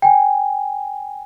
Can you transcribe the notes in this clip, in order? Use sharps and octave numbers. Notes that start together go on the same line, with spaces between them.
G5 G#5